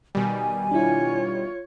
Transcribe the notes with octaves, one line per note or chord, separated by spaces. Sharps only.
B2 D#3 G3 G#5
D4 E4 F4 C#5